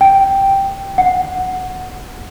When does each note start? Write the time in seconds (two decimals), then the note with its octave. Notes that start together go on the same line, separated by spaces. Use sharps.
0.01 G5
0.98 F#5